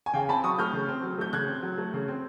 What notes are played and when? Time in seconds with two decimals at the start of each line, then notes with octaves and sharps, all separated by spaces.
0.06 G#5
0.14 C#3 F5 G5
0.29 C4 A5 B5
0.44 F#3 C#6 D#6
0.58 A3 F6 G6
0.73 C#3
0.89 C4
1.03 F#3
1.18 A3 G6
1.33 C#3 F#6 G#6
1.48 C4
1.63 F#3
1.78 A3
1.93 C#3
2.08 C4